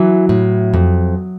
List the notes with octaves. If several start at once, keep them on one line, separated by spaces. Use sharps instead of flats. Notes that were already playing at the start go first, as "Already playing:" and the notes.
Already playing: E3 F#3
A2
F2